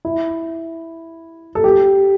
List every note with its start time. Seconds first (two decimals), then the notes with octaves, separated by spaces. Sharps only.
0.05 E4
1.55 A4
1.64 G4